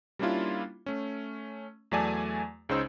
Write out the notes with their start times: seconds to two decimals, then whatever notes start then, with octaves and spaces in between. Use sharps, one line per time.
0.19 G3 A#3 C#4 D4 E4 F4
0.86 A3 C#4
1.91 E2 F#3 A3 D5 G#5 A5
2.69 C#2 C#3 C#4 D#4 C5 E6